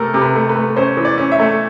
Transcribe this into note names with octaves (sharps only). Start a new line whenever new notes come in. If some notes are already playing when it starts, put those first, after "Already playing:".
Already playing: C3 A3 A4 A#4
C3
B4
A3
B4
A3
C#4 C5
E3
D5
C#4
E5
A3